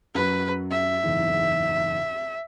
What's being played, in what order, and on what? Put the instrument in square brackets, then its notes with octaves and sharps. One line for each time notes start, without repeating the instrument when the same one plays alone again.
[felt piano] F#2 F#3 [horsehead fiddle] B4
[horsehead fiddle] E5
[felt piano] F#1 E2 G#2